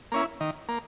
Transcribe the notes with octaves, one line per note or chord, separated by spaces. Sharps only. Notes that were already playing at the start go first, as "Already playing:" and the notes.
A#3 C#4 E4
D#3
A#3